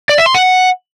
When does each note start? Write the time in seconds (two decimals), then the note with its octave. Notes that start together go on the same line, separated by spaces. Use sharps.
0.09 D5
0.18 E5
0.26 C6
0.34 F#5